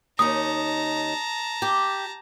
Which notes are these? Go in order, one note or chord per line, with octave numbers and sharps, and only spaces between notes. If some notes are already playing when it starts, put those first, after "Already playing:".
D#2 C#4 D#4 A5 A#5 D#6
G4